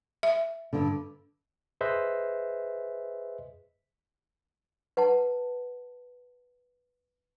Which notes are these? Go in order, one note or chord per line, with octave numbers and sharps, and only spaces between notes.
E5
G2 D3
G#4 B4 C5 D#5 E5
B4 F#5 A5